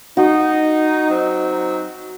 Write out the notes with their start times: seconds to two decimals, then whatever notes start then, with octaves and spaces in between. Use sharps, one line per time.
0.17 D#4 F#4
1.10 F#3 C4 D#4